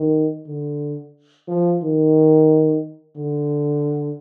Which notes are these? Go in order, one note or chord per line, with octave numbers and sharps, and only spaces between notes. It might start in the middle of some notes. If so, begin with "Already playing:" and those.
Already playing: D#3
D3
F3
D#3
D3